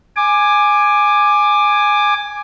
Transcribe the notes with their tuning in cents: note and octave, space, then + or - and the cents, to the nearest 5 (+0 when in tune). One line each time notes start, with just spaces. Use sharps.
G#5 +0 D6 +15